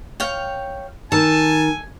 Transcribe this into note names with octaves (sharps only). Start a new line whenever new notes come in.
C#5 F5 G5
D#3 A4 G#5 A5